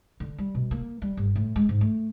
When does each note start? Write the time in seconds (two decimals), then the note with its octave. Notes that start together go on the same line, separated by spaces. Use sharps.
0.20 D3
0.38 G3
0.55 B2
0.71 A#3
1.02 G3
1.17 G1
1.36 A2
1.56 G#3
1.69 G#2
1.81 A3